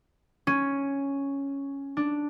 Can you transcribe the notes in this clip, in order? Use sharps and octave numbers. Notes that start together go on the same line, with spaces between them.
C#4
D4